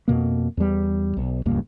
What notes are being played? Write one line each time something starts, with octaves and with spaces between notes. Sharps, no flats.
F2 B2 A#3
E2 G3
B1
D#1 C#2 G2 A#3